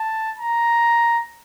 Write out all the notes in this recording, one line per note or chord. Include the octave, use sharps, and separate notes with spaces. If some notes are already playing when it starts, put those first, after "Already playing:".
Already playing: A5
A#5